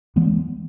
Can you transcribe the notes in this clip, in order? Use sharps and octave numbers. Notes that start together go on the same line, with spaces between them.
E3 G#3 B3